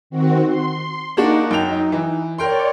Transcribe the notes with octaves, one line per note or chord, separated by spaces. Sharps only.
D#3 C4 F#4
C6
A#3 D4 D#4 F#4
F#2 G5 F7
E3
A#4 C#5 D5 G5 C6